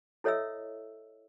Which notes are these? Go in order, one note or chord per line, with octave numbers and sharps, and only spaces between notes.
E4 A4 C#5 D#5 E5 E6